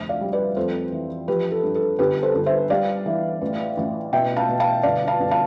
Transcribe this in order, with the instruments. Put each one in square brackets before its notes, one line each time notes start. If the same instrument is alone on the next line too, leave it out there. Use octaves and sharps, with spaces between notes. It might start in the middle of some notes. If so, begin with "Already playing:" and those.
Already playing: [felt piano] F1 D2 C5 E5
D5 F5
G3
B4 D5
F2 A4 C5
E3
F3 G4 B4
A4
G2
A4
G1 G4 B4
A4 C5
G1
C5 E5
G3 D5 F5
E3
A1
A1
B2 E5 G5
F5 A5
B2
F5 A5
G1 D5 F5
F5 A5
G1
F5 A5